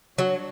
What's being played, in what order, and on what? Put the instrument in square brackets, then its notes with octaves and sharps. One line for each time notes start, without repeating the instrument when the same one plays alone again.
[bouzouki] F#3 [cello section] G3 D4 F#4 C#5